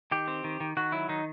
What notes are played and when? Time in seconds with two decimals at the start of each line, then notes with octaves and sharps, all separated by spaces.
0.11 D#3 G4
0.28 C4
0.44 D#3
0.60 D#3
0.77 D#3 F#4
0.92 F#3 E4
1.09 D#3 D#4